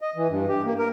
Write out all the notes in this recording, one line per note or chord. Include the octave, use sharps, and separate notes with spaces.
D#5
E3
G2
G4
A#3
A#4